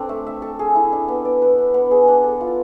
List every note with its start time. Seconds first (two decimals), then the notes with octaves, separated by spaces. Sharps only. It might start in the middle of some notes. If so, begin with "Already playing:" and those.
Already playing: C4 D4 A4
0.09 A3
0.27 E5
0.42 A4
0.59 G#4
0.75 E4
0.93 D4
1.08 B3
1.25 D5
1.42 B4
1.58 D4
1.74 B3
1.91 G#4
2.08 D4
2.24 A4
2.41 F4